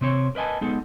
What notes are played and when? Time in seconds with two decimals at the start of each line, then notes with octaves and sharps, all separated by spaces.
0.01 C3 C4 C#5
0.35 A#4 B4 D#5 G#5 A5
0.61 G#3 B3 D#4 A4